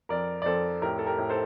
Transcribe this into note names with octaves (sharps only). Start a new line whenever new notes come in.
F2 A#4 D5
D5
F2 A4 C5
A2 G4 A#4
A4
G4 A#4
A2
A4 C5